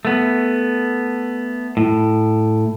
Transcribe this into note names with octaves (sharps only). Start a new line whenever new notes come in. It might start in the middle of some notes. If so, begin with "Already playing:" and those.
A3 B3
A2